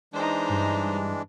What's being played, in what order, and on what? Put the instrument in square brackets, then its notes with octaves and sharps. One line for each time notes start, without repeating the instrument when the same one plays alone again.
[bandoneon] E3 G#3 D4 [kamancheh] D#4 C5
[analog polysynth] G2